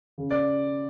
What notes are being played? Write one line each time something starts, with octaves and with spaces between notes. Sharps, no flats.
C#3
D5